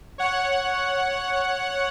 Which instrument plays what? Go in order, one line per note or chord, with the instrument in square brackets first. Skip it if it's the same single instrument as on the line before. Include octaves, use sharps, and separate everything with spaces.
[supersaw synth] C#5 F#5